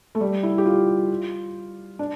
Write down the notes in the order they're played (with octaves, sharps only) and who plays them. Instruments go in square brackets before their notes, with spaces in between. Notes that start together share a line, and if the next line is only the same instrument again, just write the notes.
[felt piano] A3
G3
E4
G4
F4
D4